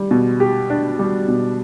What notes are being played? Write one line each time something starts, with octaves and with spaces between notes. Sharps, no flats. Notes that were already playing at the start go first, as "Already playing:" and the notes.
Already playing: G3
B2
G4
D4
G3
B2